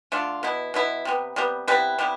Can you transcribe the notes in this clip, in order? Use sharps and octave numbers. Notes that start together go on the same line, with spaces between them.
D3 A3 D4 F4
B2 B3 E4
B2 B3 E4
C3 G3 B3
C3 G3 B3
C3 G3 B3 E4 B4
C3 G3 B3 E4